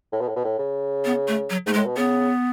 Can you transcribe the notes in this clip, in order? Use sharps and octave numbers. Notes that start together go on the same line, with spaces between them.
A2
B2
A2
B2
A2
C#3
B3
A3
F#3
G#2 A3
G#3
A2
B2
C#3 B3